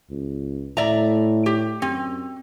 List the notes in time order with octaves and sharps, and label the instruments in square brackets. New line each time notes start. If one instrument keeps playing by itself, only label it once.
[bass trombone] C#2
[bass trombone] A2 [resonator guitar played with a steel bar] D5 E5 A#5
[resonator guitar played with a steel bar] G4
[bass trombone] F#2 [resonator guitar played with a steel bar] C4